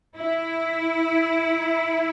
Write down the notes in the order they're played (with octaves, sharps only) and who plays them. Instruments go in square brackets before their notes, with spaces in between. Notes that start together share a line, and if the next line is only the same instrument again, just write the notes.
[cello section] E4